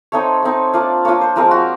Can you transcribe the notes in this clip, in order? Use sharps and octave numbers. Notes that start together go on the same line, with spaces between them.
A3 C4 D#4 C#5
A3 C4 D#4
A#3 D4 F4 D5
A#3 D4 F4 C#5
C5
F3 G#3 C4 A#4
F#4